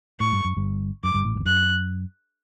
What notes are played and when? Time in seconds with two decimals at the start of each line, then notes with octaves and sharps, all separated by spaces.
0.20 A2 C#6
0.32 G2
0.45 F#2
0.57 G1 G2
1.04 F#2 D6
1.14 G1 G2
1.24 A1 A2
1.35 G1 G2
1.40 E2
1.45 F#2 F#6